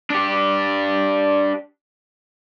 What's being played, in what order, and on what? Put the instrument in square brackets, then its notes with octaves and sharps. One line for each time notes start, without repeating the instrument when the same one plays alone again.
[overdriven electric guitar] D4 G4